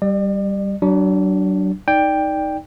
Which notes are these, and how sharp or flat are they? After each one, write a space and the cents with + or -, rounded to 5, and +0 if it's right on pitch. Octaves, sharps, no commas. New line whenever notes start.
G3 +0 D5 +40
F#3 +35 D4 +0
D#4 +0 D5 +0 G5 +10